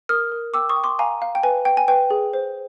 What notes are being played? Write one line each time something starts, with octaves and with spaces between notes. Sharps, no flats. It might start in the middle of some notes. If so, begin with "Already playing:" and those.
A#4 D#6 F6
A#4
G5 D6 E6
C#6 D#6
G5
C6 D6
F5 G#5 A#5
F5
G5
B4 G#5
G5
G#5
B4 G5
G#4
C5